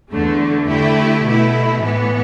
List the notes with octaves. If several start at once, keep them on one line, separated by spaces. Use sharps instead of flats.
E2 D3 A3
D3 A3 E4 G4
B2 A3 E4
A2 E3 B3